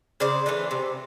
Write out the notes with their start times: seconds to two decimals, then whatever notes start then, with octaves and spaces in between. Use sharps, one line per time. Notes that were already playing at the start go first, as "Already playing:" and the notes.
0.20 C#3 C5 D5
0.46 E3 A3 D4
0.71 C3